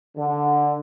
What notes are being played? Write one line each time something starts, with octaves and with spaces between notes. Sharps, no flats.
D3